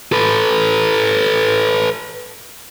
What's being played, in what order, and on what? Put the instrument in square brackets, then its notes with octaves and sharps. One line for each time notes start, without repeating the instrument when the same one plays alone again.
[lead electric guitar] A4 B4